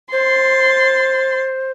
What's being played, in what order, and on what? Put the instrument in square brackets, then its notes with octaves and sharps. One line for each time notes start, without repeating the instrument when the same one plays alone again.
[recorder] C5 [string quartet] C6 A6